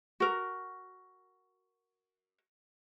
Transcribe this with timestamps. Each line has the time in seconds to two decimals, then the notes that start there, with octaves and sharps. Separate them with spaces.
0.20 F#4 A#4